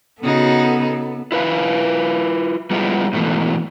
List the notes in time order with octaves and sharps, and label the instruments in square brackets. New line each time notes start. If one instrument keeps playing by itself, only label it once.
[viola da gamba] C#3 D#4 F#4 [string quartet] B3 A4
[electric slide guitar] E4 F4 B4 E5 F5
G3 G#3 B3 E4 F4
G#2 B2 E3 A3